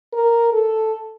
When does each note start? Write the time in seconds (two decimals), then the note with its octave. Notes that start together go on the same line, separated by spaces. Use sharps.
0.13 A#4
0.53 A4